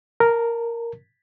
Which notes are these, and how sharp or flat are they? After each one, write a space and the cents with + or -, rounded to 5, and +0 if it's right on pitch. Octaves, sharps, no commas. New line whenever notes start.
A#4 +0 A5 +30